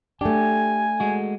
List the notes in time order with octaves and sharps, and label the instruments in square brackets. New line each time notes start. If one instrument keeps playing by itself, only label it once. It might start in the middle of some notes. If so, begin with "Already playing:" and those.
[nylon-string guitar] A3 D4 [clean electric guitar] G4 [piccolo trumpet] G#5
[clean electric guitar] G#3 F#4